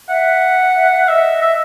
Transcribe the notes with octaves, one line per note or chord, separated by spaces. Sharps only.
E5 F#5
E5
E5
D#5 E5
E5